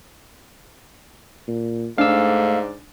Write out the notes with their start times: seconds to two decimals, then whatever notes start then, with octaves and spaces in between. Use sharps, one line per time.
1.48 A#2
1.98 G#2 A3 D4 F5 E6